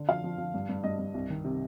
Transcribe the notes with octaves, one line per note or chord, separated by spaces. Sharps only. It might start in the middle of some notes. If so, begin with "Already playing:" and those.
Already playing: D3
F3 F5
F3
F3
G2
G2
G2 D#5
G2
C2
D#3
C3